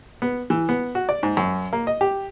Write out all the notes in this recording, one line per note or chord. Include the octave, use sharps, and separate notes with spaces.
B3
E3
B3
F#4
D5
G#2
F#2
A#3
D#5
G4